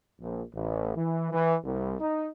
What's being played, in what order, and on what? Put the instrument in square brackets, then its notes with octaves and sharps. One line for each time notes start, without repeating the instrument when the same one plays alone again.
[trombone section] A#1
A1
E3
E3
C2
D#4